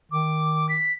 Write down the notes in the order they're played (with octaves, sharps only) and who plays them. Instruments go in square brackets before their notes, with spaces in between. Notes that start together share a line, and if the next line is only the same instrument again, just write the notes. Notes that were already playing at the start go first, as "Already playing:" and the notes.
[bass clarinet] D#3 [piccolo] D6
[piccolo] B6